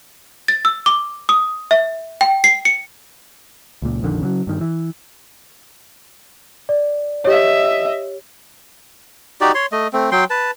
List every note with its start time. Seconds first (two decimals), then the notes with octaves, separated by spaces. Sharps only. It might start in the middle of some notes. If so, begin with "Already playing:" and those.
0.48 A6
0.65 E6
0.86 D6
1.29 D#6
1.71 E5
2.21 G5
2.44 C7
2.65 C#7
3.82 C#2 A#2
4.02 A#1 F2 D3 D#3
4.21 C#3 E3 F#3
4.47 G2 D#3
4.61 E3
6.69 D5
7.25 G4 C#5 D#5 E5
9.41 D#4 F#4 G4 D5
9.55 C#5 C6
9.72 A3 D#5
9.93 A3 C4
10.12 F#3 G5 C6
10.30 B4 A5